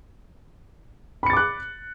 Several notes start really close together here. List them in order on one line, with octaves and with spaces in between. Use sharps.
B5 C#7 A6 D6 F#6